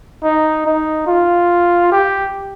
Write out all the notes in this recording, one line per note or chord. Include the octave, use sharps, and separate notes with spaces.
D#4
D#4
F4
G4